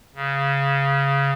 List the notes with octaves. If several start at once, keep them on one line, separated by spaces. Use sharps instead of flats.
C#3